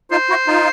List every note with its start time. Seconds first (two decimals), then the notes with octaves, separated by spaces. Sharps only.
0.11 D#4 F4 C5
0.30 E4 F#4
0.47 D#4 F4